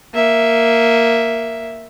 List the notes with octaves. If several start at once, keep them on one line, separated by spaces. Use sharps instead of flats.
A#3 E5